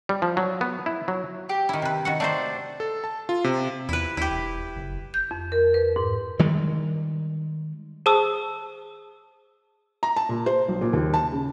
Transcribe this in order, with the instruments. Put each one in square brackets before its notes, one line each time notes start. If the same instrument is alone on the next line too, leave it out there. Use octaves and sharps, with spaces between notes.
[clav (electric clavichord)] G3
F3
F#3
B3
E4
F#3
[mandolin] G4
[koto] D#3 E4
C3 B4
D#3 F#4 F#5
[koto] A3 D#4 C5 [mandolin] D4
[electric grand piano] A4
A5
F4
C3
[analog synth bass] E2 [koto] E4 B4
[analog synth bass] D#2 [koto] E4 G4
[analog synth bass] E1
F#1
[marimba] G6
F2
A#4
B4
G#2
[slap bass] D#3 G3 G#3
[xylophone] G#4 C5 A5 D#6 E6
[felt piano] A#5
A5
A#2
C5
B1
A#2
D#2
A5
C#3